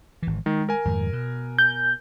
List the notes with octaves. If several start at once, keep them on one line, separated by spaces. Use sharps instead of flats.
G#1 E3
D#3 G#3
A#4 G#5
F2 G#2 D#3
B2
G6